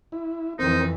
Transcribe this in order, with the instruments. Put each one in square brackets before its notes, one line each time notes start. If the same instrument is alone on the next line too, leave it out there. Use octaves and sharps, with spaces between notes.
[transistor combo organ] E4
[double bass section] F2 E3 [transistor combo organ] C4 A#4 [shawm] D#4